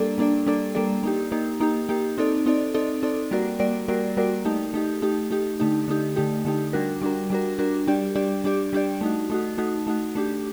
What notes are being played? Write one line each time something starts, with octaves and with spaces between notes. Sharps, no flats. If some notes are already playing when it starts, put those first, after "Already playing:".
Already playing: G3 A#3 D4 A4 D5
G3 A#3 D4 A4 D5
G3 A#3 D4 A4 D5
G3 A#3 D4 A4 D5
A#3 D#4 G4
A#3 D#4 G4
A#3 D#4 G4
A#3 D#4 G4
C4 D#4 A4 D5
C4 D#4 A4 D5
C4 D#4 A4 D5
C4 D#4 A4 D5
G3 A#3 F#4 A#4 D5
G3 A#3 F#4 A#4 D5
G3 A#3 F#4 A#4 D5
G3 A#3 F#4 A#4 D5
A3 D#4 G4
A3 D#4 G4
A3 D#4 G4
A3 D#4 G4
D3 A3 D#4 G4
D3 A3 D#4 G4
D3 A3 D#4 G4
D3 A3 D#4 G4
G3 D4 F#4 A#4
G3 D4 F#4 A#4
G3 D4 F#4 A#4
G3 D4 F#4 A#4
G3 D4 G4 D5
G3 D4 G4 D5
G3 D4 G4 D5
G3 D4 G4 D5
A3 D#4 F#4
A3 D#4 F#4
A3 D#4 F#4
A3 D#4 F#4
A3 D4 G4